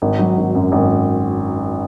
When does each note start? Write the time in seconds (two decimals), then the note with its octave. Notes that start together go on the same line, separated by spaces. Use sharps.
0.02 G#1
0.19 F#3
0.37 G#1
0.55 F#2
0.72 G#1